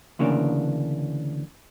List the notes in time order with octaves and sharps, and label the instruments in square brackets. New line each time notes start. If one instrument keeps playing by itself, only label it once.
[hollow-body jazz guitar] D2 C#3 E3 A#3 D4